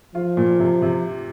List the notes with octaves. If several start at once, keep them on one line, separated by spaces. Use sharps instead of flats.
F3 F4
A#2
C3
C3